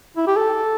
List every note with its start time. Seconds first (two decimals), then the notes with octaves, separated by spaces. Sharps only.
0.17 E4
0.27 G4
0.36 A4